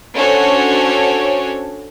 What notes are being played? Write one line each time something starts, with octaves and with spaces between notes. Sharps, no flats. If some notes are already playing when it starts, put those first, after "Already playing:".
C#4 D4 F#4 A4 C5 C#5